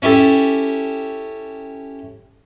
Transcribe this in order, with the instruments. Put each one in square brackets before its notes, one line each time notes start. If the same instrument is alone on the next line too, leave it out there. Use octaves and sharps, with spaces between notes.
[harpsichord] C#4 E4 G4 A4